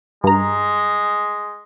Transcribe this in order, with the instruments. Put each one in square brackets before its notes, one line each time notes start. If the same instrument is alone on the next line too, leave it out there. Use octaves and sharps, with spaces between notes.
[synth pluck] G2 A#5 [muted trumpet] G#3